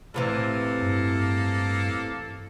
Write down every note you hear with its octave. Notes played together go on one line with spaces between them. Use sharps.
A2 C3 E3 A#3 A4
G2